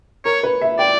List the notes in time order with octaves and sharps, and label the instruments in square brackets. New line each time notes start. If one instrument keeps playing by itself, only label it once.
[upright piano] A#4 [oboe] C#5
[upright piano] B4
E5
[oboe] D5 [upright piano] G5